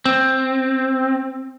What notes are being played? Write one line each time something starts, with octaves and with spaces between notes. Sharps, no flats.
C4